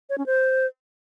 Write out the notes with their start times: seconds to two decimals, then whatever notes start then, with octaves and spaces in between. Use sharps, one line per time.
0.09 C#5
0.18 C#4
0.26 C5